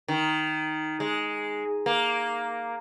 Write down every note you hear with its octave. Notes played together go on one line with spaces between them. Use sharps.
D#3
G#3
A#3